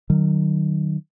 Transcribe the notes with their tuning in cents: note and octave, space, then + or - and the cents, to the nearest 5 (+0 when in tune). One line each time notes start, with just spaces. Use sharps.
D#3 -25 F#3 +20